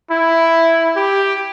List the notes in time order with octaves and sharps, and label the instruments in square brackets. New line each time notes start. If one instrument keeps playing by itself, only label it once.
[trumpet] E4
G4